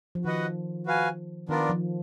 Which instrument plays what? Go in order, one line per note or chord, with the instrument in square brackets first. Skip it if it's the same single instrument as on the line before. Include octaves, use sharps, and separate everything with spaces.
[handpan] F3
[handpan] D#3 [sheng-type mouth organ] F#4 B4 D#5 F#5
[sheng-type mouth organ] F#4 B4 F5 G#5
[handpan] D#3 [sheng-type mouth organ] B3 D4 F4 A#4 D5
[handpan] F3